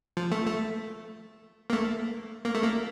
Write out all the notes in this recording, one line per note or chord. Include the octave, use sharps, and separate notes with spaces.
F3
A3
A3
A#3
A3
A#3
A3
A#3